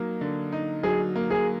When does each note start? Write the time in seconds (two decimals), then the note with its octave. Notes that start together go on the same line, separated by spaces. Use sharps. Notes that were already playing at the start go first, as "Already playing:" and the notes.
Already playing: F#3 A#3 D#4
0.21 D3
0.52 D#4
0.83 F#3 G#4
1.16 A#3
1.30 G#4